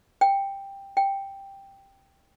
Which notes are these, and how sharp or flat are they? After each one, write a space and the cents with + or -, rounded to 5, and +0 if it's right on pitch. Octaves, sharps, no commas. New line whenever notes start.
G5 +10
G5 +5